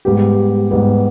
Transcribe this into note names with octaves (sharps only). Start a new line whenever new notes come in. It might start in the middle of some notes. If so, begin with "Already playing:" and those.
G#2 G3 B3 G4
G#2 G3 B3 G4